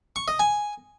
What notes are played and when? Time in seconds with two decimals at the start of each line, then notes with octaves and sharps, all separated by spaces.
0.16 C#6
0.28 D#5
0.39 G#5